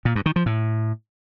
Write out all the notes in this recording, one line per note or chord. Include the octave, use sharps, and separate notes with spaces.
A#2
G2
D#3
F3
A2